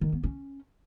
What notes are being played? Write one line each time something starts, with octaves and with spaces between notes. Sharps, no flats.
D#3
B3
C#4